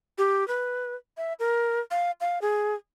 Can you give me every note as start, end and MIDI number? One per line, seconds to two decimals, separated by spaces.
0.18 0.47 67
0.48 0.95 71
1.17 1.33 76
1.39 1.80 70
1.91 2.11 77
2.21 2.39 77
2.42 2.75 68